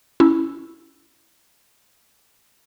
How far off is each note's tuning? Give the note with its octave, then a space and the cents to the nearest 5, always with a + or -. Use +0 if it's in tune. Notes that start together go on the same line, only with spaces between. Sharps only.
C#4 +0 E4 +0